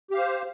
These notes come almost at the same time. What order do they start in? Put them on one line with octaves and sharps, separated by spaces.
G4 F5 C5